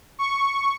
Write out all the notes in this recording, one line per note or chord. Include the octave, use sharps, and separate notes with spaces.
C#6